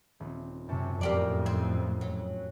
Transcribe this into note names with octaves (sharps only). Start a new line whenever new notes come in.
D#1 C4
F#2 C3 A5 C#7
F2 A2 A#3 G4 D5
C4
F#3